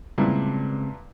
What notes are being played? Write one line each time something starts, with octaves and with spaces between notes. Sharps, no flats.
G2 A#2 C#3 G#3 C4 E4